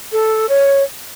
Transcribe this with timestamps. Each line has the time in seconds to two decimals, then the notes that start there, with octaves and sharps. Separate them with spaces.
0.12 A4
0.49 C#5